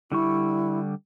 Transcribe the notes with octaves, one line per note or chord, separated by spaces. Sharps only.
D3 G3 E4 C#6